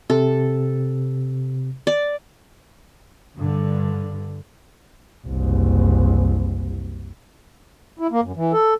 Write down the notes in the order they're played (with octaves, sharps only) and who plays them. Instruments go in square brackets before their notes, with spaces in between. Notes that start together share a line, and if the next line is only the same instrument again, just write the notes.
[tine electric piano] C3 [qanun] A4
[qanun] D5
[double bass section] G2 D3
[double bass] F#1 C2
[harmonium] E4
A#3
F#2
E3
A4